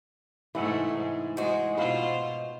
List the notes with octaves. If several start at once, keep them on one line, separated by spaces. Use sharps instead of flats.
G#2 C3 E3 A3 F#5
G#2
G#2 G#3 D#4 F#4
B2 F4 B4 C5 F5